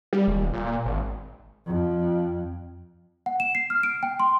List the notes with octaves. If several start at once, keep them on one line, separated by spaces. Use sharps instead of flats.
G3
D#1
A#2
G#1
F2
F#5
E7
C7
F6
D7
G5
C6